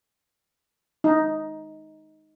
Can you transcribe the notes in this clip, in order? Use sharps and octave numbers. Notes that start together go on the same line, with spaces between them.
D#4